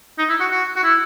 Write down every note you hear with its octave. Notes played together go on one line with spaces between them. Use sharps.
D#4
E4
F#4
F#4
F#4
E4